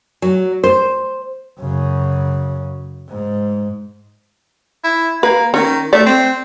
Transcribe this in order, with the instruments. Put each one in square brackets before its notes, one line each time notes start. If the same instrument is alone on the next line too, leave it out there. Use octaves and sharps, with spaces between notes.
[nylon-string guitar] F#3
C5
[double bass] F#2 C#3
G#2
[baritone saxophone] E4
[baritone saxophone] A#3 [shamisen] B4
[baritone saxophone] D#3 [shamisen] C#4
[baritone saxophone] A3 [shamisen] D5
[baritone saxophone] C4